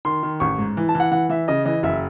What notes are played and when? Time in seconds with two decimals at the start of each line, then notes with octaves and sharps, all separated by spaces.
0.05 D#3 C6
0.23 D#3
0.40 A1 C#6
0.58 G#2
0.77 E3
0.89 A5
0.95 E3
1.00 F#5
1.12 E3 F#5
1.29 E3 E5
1.48 C#3 D#5
1.65 E3 D#5
1.83 F#1 E5